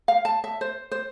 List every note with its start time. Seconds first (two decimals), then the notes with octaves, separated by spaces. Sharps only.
0.08 F5
0.25 A5
0.44 E5
0.61 C5
0.91 C5